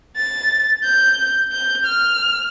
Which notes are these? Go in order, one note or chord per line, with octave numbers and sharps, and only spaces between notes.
A6
G6
G6
F6